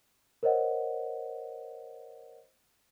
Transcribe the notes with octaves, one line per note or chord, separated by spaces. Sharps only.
A#4 C5 C#5 D#5 F#5